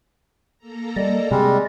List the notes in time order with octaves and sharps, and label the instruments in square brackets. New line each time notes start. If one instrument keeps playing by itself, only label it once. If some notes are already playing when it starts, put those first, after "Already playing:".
[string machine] A#3 A4 A#5
[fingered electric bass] G3 [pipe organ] D5 D#5
[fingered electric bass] C3 [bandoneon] G3 G#3